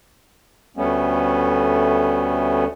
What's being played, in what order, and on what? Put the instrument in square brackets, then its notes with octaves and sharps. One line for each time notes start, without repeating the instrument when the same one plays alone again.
[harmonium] D2 G3 A3 B3 C#4